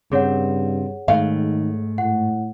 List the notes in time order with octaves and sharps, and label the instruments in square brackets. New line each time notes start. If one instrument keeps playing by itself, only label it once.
[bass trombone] G2 [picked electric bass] C#3 C4 [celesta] G#4 C#5 F#5
[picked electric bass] G#2 G#3 A3 [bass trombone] D#3 [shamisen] F5
[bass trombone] A2 [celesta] F#5